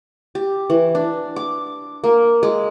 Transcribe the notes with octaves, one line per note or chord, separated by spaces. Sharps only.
G4
E3
D4
D6
A#3
G#3